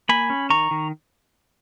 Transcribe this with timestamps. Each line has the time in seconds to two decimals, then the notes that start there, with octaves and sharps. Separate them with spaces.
0.09 A#3 G#5 B5
0.30 C#4
0.50 D#3 A#5 C#6
0.71 D#3